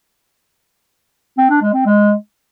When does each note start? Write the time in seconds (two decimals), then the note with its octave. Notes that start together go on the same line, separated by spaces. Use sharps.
1.38 C4
1.50 D4
1.62 G#3
1.74 C4
1.86 G#3